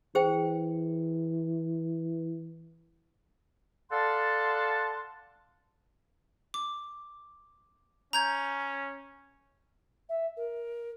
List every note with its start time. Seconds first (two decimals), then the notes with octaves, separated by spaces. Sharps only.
0.15 E3 G#4 C5 G5
3.91 A4 D5 F5 F#5 A5 C6
6.54 D6
8.13 C#4 A#5 G6 G#6
10.09 E5
10.36 A#4